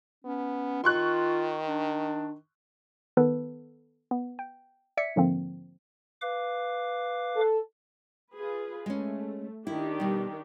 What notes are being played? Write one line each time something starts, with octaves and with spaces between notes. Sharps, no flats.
B3 C#4
D#3 F4 C6 C#6 F#6
D4
D#3 B3 A4 B4
B3
G5
D5 E5 G#6 B6 C#7
G#2 D3 F3 A#3 C4
B4 F5 D6
A4
F4 G#4 B4
G#3 A3 C#4
D#3 D4 E4 G4
B2 G3